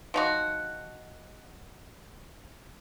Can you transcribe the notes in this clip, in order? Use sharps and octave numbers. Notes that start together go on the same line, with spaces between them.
F3 D#4 F#4